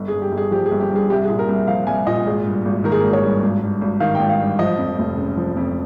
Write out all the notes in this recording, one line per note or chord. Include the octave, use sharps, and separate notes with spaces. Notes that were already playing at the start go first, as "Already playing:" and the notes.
Already playing: G1
G#4
G2
G4
G1
G#4
F3 G4
G#4
G1
G4
G2 G#4
C2 G4
G#4
A#2
A#4
C2
F3 F5
C2 G#5
A#2 D#5
G#1 G#4
G2
G#1
D#3 A#4
G#4
A#4
G#1
C#5
G2
G#1
G2
G#1
D#3 F5
G#1 G5
F5
G2
F3 D#5
F2
F1
C#3
F3
F2